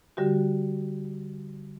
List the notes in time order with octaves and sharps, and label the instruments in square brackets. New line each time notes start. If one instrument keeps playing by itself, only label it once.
[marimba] D3 G3 F#4 G4